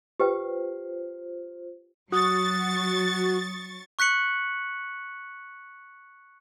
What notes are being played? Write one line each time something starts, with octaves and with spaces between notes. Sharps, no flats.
F4 G4 B4 C5 G5
F#3 F#4 C#6 D#6 A6
C#6 F#6 B6 C#7 F#7